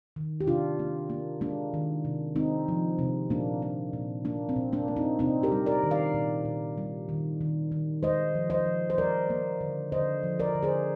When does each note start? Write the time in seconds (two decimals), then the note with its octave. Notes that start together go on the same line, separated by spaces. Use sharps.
0.16 D#3
0.41 G4
0.47 C3 D4 F4
0.79 A#3
1.10 A#3
1.41 G#3 A#3 D4
1.74 D#3
2.05 C3
2.36 G#3 C4 D#4
2.68 F3
2.99 C3
3.30 A#2 A#3 D4
3.62 A#3
3.93 A#2
4.25 A#3 D4
4.49 C4
4.56 A#2
4.73 A#3 D4
4.88 A#3
4.96 C4 D#4
5.19 C3 C4 D#4
5.43 G4 A#4
5.52 G3
5.66 A#4 D5
5.83 D#3
5.91 D5 F5
6.14 A#2
6.45 A#2
6.78 G3
7.09 D#3
7.41 D#3
7.72 D#3
8.03 G#3 C5 D#5
8.35 F3
8.50 C5 D#5
8.66 F3
8.90 C5
8.98 G3 A#4 D5
9.30 A#3
9.61 D3
9.92 D3 C5 D#5
10.23 F3
10.39 A#4 D5
10.55 D3
10.63 G#4 C5